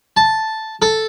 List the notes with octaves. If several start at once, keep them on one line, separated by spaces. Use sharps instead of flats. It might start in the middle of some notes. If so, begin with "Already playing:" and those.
A5
A4